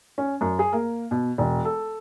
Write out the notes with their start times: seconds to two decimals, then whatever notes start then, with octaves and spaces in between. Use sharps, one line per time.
0.18 C#4
0.41 F#2
0.59 G#4
0.73 A#3
1.11 B2
1.38 E1
1.65 A4